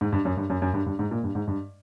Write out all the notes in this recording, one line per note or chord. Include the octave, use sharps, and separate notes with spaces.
G#2
G2
F#2
G2
F#2
F#2
G2
G2
G#2
A#2
G2
G#2
G2